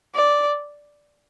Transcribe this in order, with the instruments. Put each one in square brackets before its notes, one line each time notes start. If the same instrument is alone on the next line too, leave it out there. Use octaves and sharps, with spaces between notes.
[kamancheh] D5